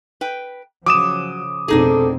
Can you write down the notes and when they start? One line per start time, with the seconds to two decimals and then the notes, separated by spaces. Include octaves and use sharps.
0.21 B4 G5
0.86 C#3 F3 F#3 D6 D#6 E7
1.68 F1 B2 C4 D4 D#4 G#4 A4